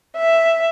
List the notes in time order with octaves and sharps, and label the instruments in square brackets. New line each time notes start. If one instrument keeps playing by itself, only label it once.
[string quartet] E5